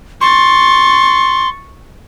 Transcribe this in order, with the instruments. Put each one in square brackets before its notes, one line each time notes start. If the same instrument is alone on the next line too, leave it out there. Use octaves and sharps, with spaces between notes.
[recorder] C6 [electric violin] C#6 A6